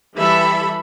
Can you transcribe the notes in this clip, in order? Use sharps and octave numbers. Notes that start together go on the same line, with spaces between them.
E3 G3 A4 E5 B5